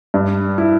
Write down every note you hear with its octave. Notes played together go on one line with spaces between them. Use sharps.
G2
E4